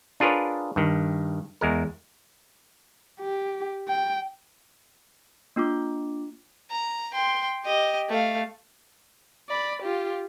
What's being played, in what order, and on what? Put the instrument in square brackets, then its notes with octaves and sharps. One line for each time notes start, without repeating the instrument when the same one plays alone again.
[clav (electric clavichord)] D4 F4 G#4 A#4 B4 C#5
G2 D#3
E2 G#3 A#4
[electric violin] G4
G5
[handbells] A#3 D4 F4 D6
[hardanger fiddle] A#5
G5 C6
G4 D#5
A3 F5
[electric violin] D5 B5
F4 G4